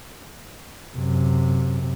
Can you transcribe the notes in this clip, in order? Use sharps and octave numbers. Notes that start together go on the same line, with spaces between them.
F#2 C3